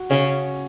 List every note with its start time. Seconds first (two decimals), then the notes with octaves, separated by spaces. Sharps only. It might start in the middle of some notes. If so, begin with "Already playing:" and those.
Already playing: F#4
0.10 C#3 C#4